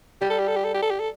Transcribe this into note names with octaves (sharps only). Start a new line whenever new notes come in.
G3 G4
A4
G4
A4
G4
A4
G4
A4
G4
A4